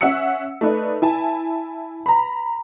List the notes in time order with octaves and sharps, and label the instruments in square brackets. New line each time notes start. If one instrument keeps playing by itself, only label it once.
[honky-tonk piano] C#4 E5 F#5 E6 C#7
A3 D#4 B4 D5
E4 G#5 A5
A#5 B5